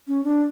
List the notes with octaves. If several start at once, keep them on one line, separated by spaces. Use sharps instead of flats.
C#4
D4